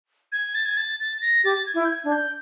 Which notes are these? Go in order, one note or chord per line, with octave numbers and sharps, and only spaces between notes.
G#6
A6
G#6
A6
A6
A#6
G4 A6
G#6
E4
G6
G#6
D4
G6